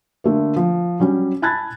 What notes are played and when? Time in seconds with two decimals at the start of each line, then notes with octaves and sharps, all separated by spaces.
0.24 D3 A3 A#3
0.56 F3
1.00 F#3 G3 C#4
1.42 G#5 A5 B5 F#6 G#6 A6